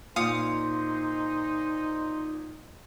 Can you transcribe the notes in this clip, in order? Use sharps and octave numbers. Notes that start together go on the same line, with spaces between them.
A#2 D#4 C5 F5 D#6 C#7